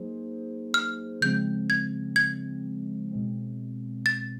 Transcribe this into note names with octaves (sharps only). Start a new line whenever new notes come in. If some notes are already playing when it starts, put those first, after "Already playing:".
Already playing: F#3 A#3 D#4 G#4 C5
F6
C#3 F3 G#3 C4 G6
G#6
G#6
B2 G#3 C4
A6